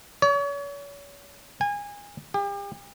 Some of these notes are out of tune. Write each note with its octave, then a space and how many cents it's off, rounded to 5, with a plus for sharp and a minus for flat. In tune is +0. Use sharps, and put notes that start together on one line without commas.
C#5 +40
G#5 -25
G4 +40